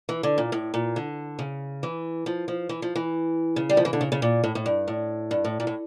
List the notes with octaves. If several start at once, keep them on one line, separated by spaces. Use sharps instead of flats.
E3
D3
A#2
A2
A#2
D3
C#3
E3
F3
F3
E3
F3
E3
C#3
G3
F3
E3
D3
C#3
C#3
A#2
A2
A2
G2
A2
G2
A2
A#2
A2